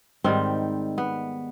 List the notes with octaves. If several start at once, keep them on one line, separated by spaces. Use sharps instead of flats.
G#2 D#3 G3 C4
B3